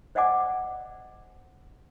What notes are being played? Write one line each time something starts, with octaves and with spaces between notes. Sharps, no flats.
C5 D5 D#5 F#5 G#5 D6